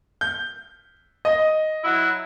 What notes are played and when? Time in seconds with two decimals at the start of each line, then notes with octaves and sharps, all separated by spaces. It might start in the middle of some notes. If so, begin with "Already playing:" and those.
0.21 G6
1.25 D#5
1.83 F#3 E4